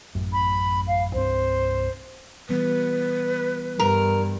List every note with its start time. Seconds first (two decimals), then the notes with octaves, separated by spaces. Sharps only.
0.15 A1 F#2
0.33 B5
0.88 F5
1.14 C2 G2 C4 C5
2.49 E3 G3 B3 B4
3.79 G2 A#4